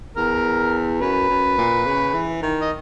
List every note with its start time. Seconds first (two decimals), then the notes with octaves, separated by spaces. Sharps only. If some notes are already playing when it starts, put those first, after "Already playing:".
0.17 E2 A#4
1.01 F#2 B4
1.29 F#2
1.58 A#2
1.86 C#3
2.14 E3
2.42 D#3
2.61 D#5